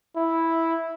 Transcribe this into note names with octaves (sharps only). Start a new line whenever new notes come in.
E4